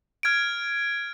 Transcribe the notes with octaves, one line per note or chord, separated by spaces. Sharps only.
F6 G#6 D7